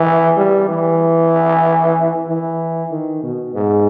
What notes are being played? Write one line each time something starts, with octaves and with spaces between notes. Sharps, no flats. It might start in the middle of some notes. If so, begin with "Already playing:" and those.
Already playing: E3
G3
E3
E3
D#3
B2
G#2